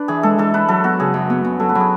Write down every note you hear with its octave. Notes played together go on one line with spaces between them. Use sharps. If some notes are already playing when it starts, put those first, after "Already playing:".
Already playing: D4 B4
E3 G#4
G#3 A4
E3 A4
D4 B4
F#3 A4
B3 F#4
C#3 G#4
F#2
B3
B3
F#3 A4
B4
F#3
G#4